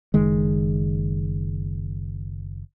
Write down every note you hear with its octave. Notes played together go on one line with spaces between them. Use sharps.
F#1 D#3 G#3